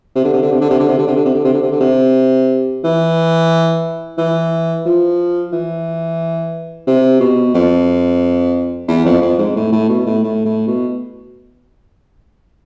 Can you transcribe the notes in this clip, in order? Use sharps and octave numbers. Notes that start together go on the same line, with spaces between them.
C3
D3
C3
D3
C3
D3
C3
D3
C3
D3
C3
D3
C3
D3
C3
D3
C3
D3
C3
E3
E3
F3
E3
C3
B2
F2
E2
F2
F2
G#2
A2
A2
B2
A2
A2
A2
B2